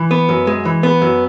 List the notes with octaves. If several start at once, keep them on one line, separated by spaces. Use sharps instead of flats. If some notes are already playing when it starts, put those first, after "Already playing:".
Already playing: E3
B3
F#2
G#3
E3
B3
F#2